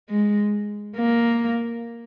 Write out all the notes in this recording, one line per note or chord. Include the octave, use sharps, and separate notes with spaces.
G#3
A#3